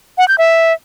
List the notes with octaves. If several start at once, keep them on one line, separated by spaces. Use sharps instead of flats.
F#5
G6
E5